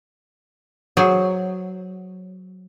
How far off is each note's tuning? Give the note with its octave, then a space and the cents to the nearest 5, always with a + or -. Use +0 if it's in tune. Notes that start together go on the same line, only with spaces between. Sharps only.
F#3 +0 G#4 +0 C5 +0